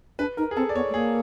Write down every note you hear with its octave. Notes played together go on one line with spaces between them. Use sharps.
D4 B4
D#4 A#4
G#4
C4 A4
D5
B3 C#5
A3
A#3 G#4